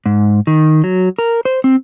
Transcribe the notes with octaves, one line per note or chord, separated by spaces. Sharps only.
G#2
D#3
F#3
A#4
C5
C4